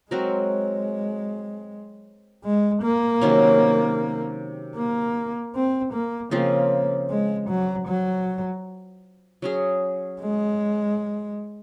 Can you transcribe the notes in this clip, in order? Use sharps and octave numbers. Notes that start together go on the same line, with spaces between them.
F#3 G#3 C4 F#4 A#4
G#3
A#3
C3 D#3 F#3 C#4
A#3
C4
A#3
C#3 F3 A#3 C4
G#3
F#3
F#3
F#3 C#4 G#4
G#3